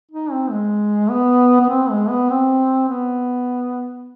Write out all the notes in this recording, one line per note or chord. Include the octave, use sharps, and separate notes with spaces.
D#4
C4
G#3
B3
B3
C4
G#3
B3
C4
B3